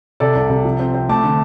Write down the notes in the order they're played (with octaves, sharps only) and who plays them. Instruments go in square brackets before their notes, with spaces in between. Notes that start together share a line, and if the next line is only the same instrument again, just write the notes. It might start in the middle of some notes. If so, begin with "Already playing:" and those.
[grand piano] C3 A4 D5
C2
C3
F3
C4
C4
A3 A5 D6
D3